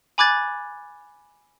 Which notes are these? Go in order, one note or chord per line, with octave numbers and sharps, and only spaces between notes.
G#5 B5 D6 F#6 G#6 A6